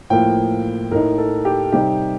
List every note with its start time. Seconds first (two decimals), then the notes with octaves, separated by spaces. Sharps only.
0.10 A2 F3 A#3 G5
0.91 A2 A3 D#4 A#4
1.18 A4
1.45 G4
1.72 C3 G3 C4 D#4 G4